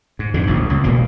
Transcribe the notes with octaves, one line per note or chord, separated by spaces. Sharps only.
G#2
F2 G#2 D3
D1 A#1
C#2
E1 B2 A#3